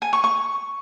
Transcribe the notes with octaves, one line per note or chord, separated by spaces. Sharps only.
G#5
C#6
C#6